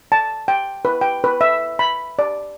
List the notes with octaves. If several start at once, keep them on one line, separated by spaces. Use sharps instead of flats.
A5
G5
B4
G5
B4
E5
B5
D5